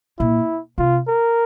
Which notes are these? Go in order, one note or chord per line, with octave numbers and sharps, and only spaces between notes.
A#2 E4
C3 F4
A#4